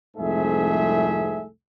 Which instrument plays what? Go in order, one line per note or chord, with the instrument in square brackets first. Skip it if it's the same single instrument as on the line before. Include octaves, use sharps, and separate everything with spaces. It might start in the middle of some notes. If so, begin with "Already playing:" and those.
[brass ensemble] C2 F2 G#2 A3 G#4 E5